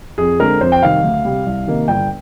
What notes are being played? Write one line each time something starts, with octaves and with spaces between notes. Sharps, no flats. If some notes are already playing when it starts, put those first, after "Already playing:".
F2 G#4
D3 G#3 C4 A#4
F2 C5
G5
C3 D#3 G3 F5
D2
C3 G3
C2
C3 D#3 A#3 D#4
G1 G5